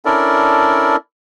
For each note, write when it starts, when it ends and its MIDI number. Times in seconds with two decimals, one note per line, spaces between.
0.05 0.96 61
0.05 0.96 62
0.05 0.96 64
0.05 0.96 69
0.05 0.96 70
0.05 0.96 74